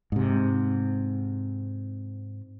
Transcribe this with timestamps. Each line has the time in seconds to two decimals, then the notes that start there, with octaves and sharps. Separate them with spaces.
0.12 G#2 C3